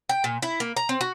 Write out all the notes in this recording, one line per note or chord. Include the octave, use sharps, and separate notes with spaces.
G5
A#2
E4
A#3
A#5
C4
F#4